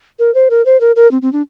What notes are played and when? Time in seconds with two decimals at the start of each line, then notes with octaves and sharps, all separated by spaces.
0.19 A#4
0.34 C5
0.50 A#4
0.65 C5
0.81 A#4
0.96 A#4
1.11 C4
1.22 C4
1.33 D4